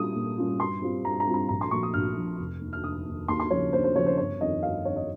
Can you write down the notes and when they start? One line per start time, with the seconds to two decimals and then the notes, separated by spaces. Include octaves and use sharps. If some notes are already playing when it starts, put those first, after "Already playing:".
Already playing: A#2 G3 C#4 F4 D#6
0.16 A#2
0.38 G3 C#4 F4
0.60 G2 C6
0.82 G3 C4 F4
1.05 G2 A#5
1.20 A#5
1.27 G3 C4 F4
1.34 A#5
1.49 A#1 A#5
1.61 C6
1.71 A#2 F3 C#6
1.83 D#6
1.94 A#1 F6
2.17 A#2 F3
2.39 F1
2.61 D#2 D#3
2.73 F6
2.83 F1 D#6
3.06 D#2 D#3
3.28 D#2 C6
3.40 C6
3.51 C#3 F3 C#5
3.73 D#2 C5
3.84 C5
3.95 C#3 F3 C#5
4.06 C5
4.18 G1 C#5
4.40 F2 D#3 D#5
4.62 G1 F5
4.85 F2 D#3 C#5
4.96 D#5